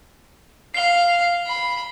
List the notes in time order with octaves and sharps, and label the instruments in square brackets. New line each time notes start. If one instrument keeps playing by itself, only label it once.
[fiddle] F5 [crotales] C7 G7
[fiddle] B5